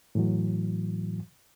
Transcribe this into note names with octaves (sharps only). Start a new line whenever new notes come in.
A2 E3 F#3